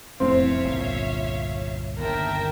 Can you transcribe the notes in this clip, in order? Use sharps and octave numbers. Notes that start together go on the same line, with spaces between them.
E1 F2 A2 C4 C#5 E5 F5
G1 C2 A#2
G1 D#2 A#4 E5 G5 A5